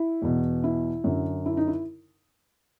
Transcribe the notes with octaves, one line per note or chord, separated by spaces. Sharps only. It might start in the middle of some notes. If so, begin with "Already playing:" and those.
Already playing: E4
E2 B2
E4
F#2 D3
E4
D#4
E4